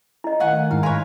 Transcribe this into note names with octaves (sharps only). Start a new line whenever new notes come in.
E4 D#5
D#3 F5 F#5 G#5 C#6
A3
G#2 G#3 D#4 E4 F5
A#4 B4 C#5 F5 G#5 C6